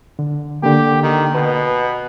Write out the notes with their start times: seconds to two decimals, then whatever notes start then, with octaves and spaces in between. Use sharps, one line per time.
0.19 D3
0.63 D3 A#3 G4
1.03 D#3
1.35 B2 B4